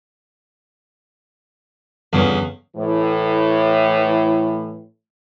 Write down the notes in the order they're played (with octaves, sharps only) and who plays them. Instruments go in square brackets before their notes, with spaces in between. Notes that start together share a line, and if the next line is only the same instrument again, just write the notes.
[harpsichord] E2 C#3 [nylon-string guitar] G2 A3 F4
[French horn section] A2 E3